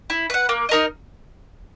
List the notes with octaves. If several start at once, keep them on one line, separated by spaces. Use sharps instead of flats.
E4
B4 F#5
A#3
D#4 A#4 D#5